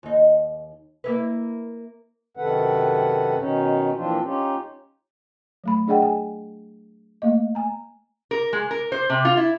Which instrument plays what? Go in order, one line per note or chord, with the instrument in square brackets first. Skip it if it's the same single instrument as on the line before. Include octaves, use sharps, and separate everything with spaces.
[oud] D#2 D#4
A#3 E4 B4
[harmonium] F#2 C3 D#3 A4 B4 F#5
B2 D#3 C#4 D#4
A#2 E3 F3 C4 D4 F4
C#4 D#4 F4 G4
[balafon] F#3 A3 B5
D4 G#4 D5 D#5 F#5 G5
G#5
A3 A#3 D#5
G#5 A#5
[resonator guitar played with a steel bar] A#4
G#3
A#4
C5
C3
F4
E4